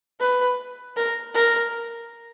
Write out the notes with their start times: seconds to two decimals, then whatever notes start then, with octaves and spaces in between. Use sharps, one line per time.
0.21 B4
0.97 A#4
1.35 A#4